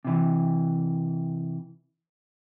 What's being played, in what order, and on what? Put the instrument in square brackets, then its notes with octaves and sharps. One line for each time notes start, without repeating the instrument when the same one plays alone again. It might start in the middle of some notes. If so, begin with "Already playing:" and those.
[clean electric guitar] C3 E3